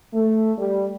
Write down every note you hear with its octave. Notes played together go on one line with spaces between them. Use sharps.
A3
G3